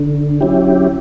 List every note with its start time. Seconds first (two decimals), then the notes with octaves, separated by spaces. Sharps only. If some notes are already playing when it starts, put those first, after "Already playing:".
Already playing: D3
0.40 F#3 C#4 E4 G4